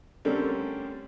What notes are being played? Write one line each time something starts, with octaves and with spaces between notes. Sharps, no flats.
D3 G3 A3 C4 C#4 A#4